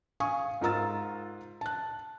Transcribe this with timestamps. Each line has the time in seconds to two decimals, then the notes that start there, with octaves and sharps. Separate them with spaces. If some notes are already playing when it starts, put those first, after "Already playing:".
0.20 F5 G#5 C#6 D#6
0.61 G#2 F4 A#4 A#5 E6 A6
1.61 A5 F#6